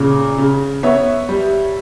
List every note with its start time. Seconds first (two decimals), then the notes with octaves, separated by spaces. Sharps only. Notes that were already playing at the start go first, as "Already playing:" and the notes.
Already playing: A#2 C#3
0.38 C#3
0.83 B3 C#5 E5
1.29 G3